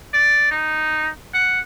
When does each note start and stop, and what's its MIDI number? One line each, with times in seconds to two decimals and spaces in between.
0.14 0.47 74
0.51 1.10 63
1.34 1.60 78